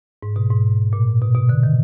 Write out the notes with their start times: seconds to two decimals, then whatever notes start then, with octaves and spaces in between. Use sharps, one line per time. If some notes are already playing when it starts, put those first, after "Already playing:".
0.23 G#2
0.36 B2
0.50 G#2
0.93 A#2
1.21 B2
1.35 B2
1.49 D3
1.63 D#3